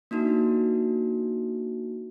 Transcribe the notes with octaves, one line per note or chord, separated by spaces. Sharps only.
A#3 D4 D#4 F#4